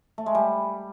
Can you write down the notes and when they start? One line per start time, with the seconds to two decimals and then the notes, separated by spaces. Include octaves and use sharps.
0.18 A3
0.26 G#3
0.35 G3